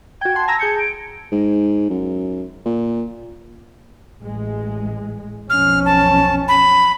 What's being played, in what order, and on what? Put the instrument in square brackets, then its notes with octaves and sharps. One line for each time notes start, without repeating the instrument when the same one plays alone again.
[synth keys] F#4 G5 [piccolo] G#6
[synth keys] F#5 C6 [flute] A5
[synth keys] G#5 A#5 E6 [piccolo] A#6
[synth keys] G#4 G6 G#6 [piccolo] C#7
[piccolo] D7
[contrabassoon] G#2
F#2
A#2
[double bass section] A1 G#3
[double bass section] B1 F2 C#4 [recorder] F6
[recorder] A5
B5